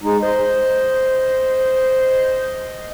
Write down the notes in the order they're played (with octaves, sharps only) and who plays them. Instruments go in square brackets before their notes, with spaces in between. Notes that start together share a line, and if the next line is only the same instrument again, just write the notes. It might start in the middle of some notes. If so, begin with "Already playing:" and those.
[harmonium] G#3 D#4
[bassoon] C5 [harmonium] D#5